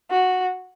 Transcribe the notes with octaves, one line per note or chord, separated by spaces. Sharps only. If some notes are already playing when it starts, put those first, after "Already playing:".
F#4